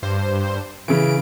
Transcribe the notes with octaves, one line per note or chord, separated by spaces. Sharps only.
G2 C5
C#3 E3 D7